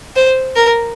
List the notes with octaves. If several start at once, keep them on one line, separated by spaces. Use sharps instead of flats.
C5
A#4